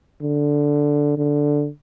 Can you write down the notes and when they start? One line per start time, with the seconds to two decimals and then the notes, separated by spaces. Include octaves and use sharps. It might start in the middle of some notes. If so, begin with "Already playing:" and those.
0.22 D3
1.18 D3